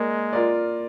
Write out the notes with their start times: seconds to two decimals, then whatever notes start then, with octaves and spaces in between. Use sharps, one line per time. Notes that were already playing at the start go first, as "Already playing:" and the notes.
Already playing: G#3 A#3 D5
0.33 F4 A#4 D5